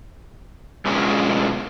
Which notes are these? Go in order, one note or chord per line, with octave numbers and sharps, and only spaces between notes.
B2 G#3 C#4 D4 F4